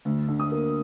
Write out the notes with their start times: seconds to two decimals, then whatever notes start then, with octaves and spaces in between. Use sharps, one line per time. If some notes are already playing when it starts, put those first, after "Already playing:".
0.05 D2
0.28 D3
0.40 D#6
0.52 A#3